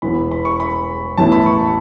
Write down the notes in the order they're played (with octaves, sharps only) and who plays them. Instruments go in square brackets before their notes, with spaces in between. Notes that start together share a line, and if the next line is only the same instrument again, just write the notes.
[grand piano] E1 E2 E3 B3 E4 B5
B5
C#6
B5
A1 A2 E3 B3 E4 A5
B5
C#6